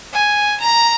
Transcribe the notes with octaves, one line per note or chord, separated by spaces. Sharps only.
G#5
A#5